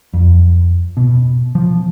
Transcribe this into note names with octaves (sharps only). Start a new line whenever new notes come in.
F2
B2
F3